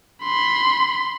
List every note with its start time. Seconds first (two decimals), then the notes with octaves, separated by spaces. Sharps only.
0.24 B5 C6